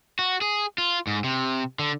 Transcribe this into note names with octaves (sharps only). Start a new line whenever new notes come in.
F#4
G#4
F4
G#2
C3
D3